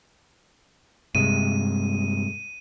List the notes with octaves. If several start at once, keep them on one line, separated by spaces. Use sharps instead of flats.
G2 C3 G#3 D#7